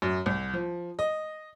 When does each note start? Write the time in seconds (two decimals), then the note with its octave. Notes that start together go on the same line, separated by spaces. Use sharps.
0.02 F#2
0.26 C2
0.54 F3
0.99 D#5